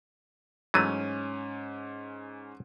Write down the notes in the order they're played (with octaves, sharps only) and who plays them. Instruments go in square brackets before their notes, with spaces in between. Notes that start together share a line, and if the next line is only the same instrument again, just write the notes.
[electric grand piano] G#2 C#4 D#7 [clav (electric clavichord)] E3 F#3 A3